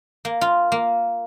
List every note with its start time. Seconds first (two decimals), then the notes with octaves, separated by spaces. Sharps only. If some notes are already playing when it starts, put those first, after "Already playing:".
0.25 A#3
0.41 F4
0.72 A#3